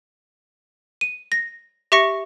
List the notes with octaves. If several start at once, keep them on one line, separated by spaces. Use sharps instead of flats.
D#7
A#6
G4 E5 C#6 A#6 C#7